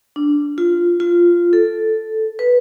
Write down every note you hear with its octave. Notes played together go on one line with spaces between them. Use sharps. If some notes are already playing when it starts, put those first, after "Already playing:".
D4
F4
F4
A4
B4